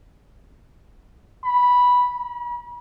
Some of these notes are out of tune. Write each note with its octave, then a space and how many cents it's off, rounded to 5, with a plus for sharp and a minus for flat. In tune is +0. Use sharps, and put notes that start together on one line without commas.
B5 -10
B5 -40